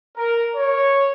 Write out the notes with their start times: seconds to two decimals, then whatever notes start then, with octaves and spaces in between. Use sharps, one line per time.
0.17 A#4
0.56 C#5